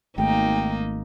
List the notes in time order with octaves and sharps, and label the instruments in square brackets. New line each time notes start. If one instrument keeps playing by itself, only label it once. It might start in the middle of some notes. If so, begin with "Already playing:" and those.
[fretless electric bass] G#1 [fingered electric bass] A3 [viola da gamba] A#3 D#4 [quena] G5